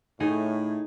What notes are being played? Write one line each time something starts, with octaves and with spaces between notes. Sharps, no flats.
A2 D#4 G#4